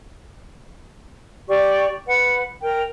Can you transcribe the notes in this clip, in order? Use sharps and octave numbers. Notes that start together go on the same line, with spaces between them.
G4 D5 C#6
B4 F#5
A#4 G5